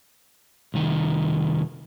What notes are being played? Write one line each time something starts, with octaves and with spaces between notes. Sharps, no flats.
C2 D#3